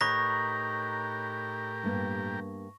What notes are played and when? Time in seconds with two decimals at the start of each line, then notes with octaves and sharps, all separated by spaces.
0.01 A2 D#4 G4 A#4 B4 C#5 C#6 A#6
1.84 G2 A#3 B3